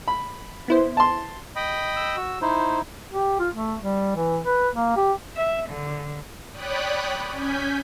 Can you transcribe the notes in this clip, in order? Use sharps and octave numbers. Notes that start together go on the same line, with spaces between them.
B5
B3 E4 C5
A5 C6
D#5 G5 B5
E6
F#4
D#4 E4 C5
G4
F4
A3
G3
E3
B4
A#3
G4
E5
D3
C#5 D5 G5 B5 D#6 F#6
C#4 G#5 G6 B6